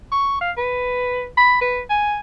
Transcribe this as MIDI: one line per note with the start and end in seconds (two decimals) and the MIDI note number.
0.12 0.37 85
0.41 0.51 77
0.57 1.26 71
1.37 1.60 83
1.61 1.82 71
1.90 2.20 80